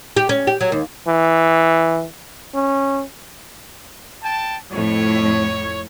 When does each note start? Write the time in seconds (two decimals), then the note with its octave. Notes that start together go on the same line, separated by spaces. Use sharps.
0.17 G4
0.29 C#4
0.47 G4
0.61 F#3
0.72 D#2
1.07 E3
2.54 C#4
4.23 G5 A5
4.72 F2 A2 C#5